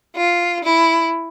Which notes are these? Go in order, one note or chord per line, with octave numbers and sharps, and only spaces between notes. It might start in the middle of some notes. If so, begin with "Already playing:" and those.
F4
E4